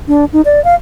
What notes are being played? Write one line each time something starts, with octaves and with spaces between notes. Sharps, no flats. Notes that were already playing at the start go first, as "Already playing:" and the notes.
D4
D#4
D5
F5